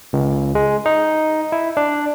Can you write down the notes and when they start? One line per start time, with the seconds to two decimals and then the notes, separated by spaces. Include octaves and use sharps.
0.13 C#2
0.55 G#3
0.86 D#4
1.52 E4
1.77 D4